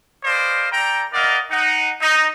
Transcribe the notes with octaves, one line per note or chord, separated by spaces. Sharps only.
G#4 B4 C5 D5 D#5 F5
A4 D5 G5 A#5
E4 A#4 D5 D#5 F5 F#5
D#4 F#5
D#4